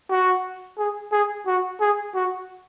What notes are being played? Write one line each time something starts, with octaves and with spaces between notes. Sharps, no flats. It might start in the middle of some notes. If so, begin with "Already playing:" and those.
F#4
G#4
G#4
F#4
G#4
F#4